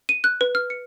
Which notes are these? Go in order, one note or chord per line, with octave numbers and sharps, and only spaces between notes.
D#7
F#6
B4
F6
C#7